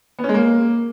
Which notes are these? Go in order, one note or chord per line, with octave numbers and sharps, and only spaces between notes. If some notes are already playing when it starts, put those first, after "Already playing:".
B3
C#4
G#3
A#3